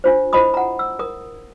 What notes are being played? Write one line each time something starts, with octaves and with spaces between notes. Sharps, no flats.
D4 F4 C5
E4 F4 C5 D#5 B5 D#6
F#5 A#5
E6
A#4 D#6